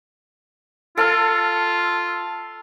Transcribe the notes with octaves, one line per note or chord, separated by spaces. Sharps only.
F4 A4 F5